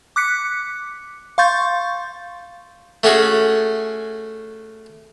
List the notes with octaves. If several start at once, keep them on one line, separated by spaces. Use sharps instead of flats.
D6 F#6 B6 C#7
F5 C6 C#6 G6 A6
A3 C#4 F#4 G#4